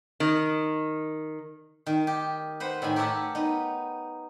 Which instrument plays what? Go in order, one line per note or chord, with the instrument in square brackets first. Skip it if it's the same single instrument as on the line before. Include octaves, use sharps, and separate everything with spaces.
[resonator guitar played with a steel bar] D#3
[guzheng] D#3
G4
B4 C5 F#5
A2 D#3 G#5 B5
G4 A#4 C#5 E5 F#5 A5
B3 D#4